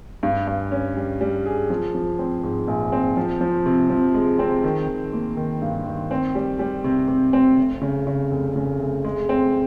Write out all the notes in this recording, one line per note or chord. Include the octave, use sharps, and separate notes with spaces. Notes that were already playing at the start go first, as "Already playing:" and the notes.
G2
G2
C#4
G3
G3
G#4
F3
F3
C4
G#2
A#1
C4
F3
F3
C3
F3
G#3
C4
D#3
D#3
A#3
D#3
G2
D#3
C4
G3
G3
C3
C3
C4
F1
C#3
C#3
F1
C#3
F1
G#3
C4